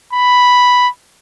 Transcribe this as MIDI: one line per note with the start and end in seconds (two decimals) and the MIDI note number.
0.13 0.88 83